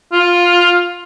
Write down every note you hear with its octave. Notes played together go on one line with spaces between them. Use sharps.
F4